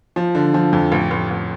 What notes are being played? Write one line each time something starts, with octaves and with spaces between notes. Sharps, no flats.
F3
D3
F3
F2
A1
A1
A1